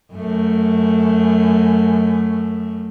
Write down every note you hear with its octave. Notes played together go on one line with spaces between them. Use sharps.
F#2 A3